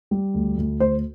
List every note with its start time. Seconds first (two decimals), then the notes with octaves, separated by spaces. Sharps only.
0.11 G3
0.34 D2
0.57 D2
0.80 D2 C5